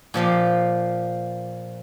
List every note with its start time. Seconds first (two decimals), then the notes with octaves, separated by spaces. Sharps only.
0.14 A#2 F3 G4 F5